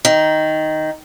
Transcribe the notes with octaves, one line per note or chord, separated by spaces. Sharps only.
D#3